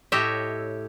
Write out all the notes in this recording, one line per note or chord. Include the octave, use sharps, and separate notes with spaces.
A2 G4 C#5 D#5 E5